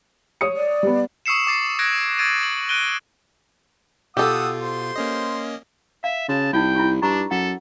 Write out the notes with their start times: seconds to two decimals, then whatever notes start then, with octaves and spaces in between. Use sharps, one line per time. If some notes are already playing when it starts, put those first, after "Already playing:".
0.41 C#5 D#6 C#7
0.57 D5
0.83 G3 B3
1.26 C#6 D#6 E6 C7 C#7 E7
1.47 D6 A6 C7 C#7
1.79 D#6 F#6 G#6 A#6 D7
2.18 E6 G#6 A6 D7 D#7
2.43 F#7
2.69 F#6 A6 D7 D#7 G7
4.17 B2 F4 G4 A4 F#5 D#6 E6
4.62 C5 C6
4.96 A#3 C#4 D#5
6.04 E5 F5
6.29 C#3 F#4 A5
6.53 C2 D#4 F4 G5
6.75 E4 F4 G4
7.02 G2 D4 A#5 C#6
7.31 F#2 A4 F#5